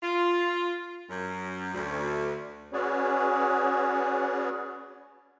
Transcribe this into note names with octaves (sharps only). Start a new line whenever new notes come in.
F4
F#2
D2
C#4 F#4 G#4 B4 C#5 D5